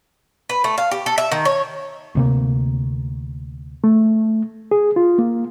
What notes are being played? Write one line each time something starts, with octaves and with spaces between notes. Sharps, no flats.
B4
A3
F5
G4
A4
E5
D#3
C#5
D2 C3 A#3
A3
G#4
F4
A#3